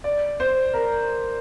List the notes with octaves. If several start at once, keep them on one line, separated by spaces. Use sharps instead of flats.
D5
C5
A#4